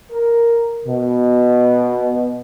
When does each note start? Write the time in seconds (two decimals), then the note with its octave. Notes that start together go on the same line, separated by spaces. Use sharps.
0.12 A#4
0.87 B2